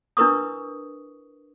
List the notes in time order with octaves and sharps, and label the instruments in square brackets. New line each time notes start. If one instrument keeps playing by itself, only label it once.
[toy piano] D4 E4 A#4 B4 C#6 D#6